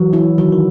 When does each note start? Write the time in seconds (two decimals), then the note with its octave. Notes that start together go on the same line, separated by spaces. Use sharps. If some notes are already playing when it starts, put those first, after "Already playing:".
Already playing: E3 F#3
0.13 E3 E4
0.38 D#3 F#3
0.52 D#3